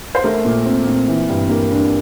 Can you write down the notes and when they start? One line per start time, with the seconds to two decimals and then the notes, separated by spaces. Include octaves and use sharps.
0.15 C5
0.24 A3 A#4
0.45 A#2
0.65 C4
0.87 A#2
1.08 E3
1.29 G2
1.49 A#3
1.71 D4